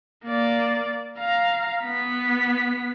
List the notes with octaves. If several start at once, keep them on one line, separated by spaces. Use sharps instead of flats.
A#3 D5
F5 A#5
B3 B6